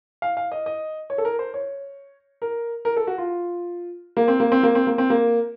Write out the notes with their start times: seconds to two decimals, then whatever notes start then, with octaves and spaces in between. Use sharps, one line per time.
0.22 F5
0.37 F5
0.52 D#5
0.66 D#5
1.10 C#5
1.18 A4
1.25 A#4
1.39 C5
1.54 C#5
2.42 A#4
2.85 A#4
2.97 A4
3.07 F#4
3.18 F4
4.17 A#3
4.28 C4
4.40 A#3
4.52 C4
4.63 A#3
4.75 C4
4.87 A#3
4.98 C4
5.10 A#3